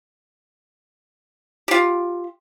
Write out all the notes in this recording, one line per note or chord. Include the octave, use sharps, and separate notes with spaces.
F4 G4